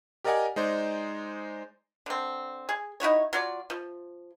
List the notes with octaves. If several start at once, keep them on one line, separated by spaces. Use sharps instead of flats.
G4 A#4 D5 D#5 F#5 G#5
G#3 D#4 C5 D5
D3 C4
G#4
D#4 E4 F#4 C#5
F#3 F4 D5
F3